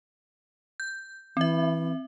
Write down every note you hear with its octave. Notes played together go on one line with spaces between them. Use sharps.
G6
E3 C4 E5